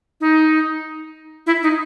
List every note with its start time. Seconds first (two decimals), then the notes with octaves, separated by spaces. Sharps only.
0.21 D#4
1.46 E4
1.63 D#4